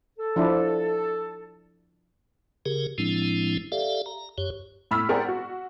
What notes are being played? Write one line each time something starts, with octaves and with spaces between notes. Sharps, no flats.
A4
F3 D4 E4
C#3 G4 G#4 A#4
A2 F3 G#3 C4 D4 E4
G4 A4 D5 E5 F5
A#5
F#2 G4 C#5
A2 B5 E6 F6 B6
G#4 A#4 C5 D5 F#5 G5
F#4